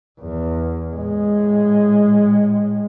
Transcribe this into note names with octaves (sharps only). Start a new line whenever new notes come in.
E2
A2 G#3